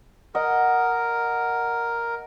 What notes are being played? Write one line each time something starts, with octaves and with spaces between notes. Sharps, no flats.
A#4 D#5 F#5